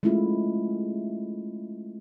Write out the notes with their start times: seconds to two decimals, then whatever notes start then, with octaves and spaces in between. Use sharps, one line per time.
0.03 G#3 A3 C#4 E4 F4